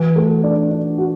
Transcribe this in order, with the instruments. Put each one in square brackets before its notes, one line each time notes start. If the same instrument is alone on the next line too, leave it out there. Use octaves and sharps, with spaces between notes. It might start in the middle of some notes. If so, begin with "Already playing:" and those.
Already playing: [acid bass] E3 [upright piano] F#4
[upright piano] A3
D4
D4
F#4